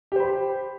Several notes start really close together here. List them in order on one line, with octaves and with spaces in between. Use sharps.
G4 C5 B5